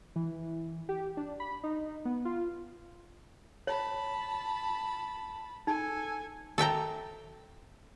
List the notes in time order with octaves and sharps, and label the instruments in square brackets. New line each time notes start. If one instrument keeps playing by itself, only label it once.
[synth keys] E3
G4
D4
B5
D#4
B3
F4
[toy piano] C#5 [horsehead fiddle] A5 B5
[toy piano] D#4 [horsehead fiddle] A4 G#5
[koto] A4 E5 G5 A#5